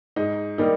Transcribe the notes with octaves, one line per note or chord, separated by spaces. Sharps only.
G#2 D#4
D#3 G3 A#3 D#4